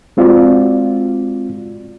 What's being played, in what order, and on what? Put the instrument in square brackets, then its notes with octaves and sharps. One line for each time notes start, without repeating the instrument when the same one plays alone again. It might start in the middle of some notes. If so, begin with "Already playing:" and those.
[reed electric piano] G#3 C4 F4 F#4 D5